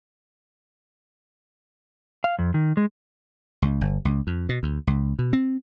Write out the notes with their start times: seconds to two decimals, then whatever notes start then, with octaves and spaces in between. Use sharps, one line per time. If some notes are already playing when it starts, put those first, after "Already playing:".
2.24 F5
2.39 F2
2.54 D#3
2.77 G#3
3.62 C#2
3.81 G1
4.05 C#2
4.27 F2
4.49 B2
4.63 D2
4.87 C#2
5.19 B2
5.33 C4